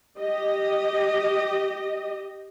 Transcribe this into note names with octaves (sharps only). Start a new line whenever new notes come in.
G4 D#5